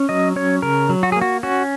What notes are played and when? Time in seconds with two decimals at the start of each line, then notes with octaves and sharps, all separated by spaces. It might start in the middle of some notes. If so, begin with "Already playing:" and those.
Already playing: C#4
0.09 F#3 D#5
0.36 C#4 C#5
0.62 C#3 A#4
0.89 F#3
1.03 F#4
1.12 G#4
1.16 A#3
1.21 F#4
1.43 C#4 F#4